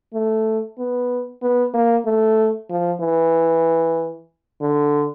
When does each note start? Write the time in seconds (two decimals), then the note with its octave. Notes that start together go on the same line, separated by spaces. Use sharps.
0.14 A3
0.78 B3
1.42 B3
1.74 A#3
2.06 A3
2.70 F3
3.01 E3
4.61 D3